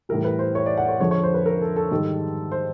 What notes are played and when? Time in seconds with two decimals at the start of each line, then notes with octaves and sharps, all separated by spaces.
0.09 A2 E3 G3 A#4
0.25 B4
0.39 C5
0.55 C#5
0.66 D5
0.77 F#5
0.88 C#5
1.00 F2 D3 F3 G#3 C#5
1.11 C#5
1.23 C5
1.34 B4
1.46 A#4
1.61 A4
1.76 A4
1.91 G#2 D#3 G3 A4
2.52 C5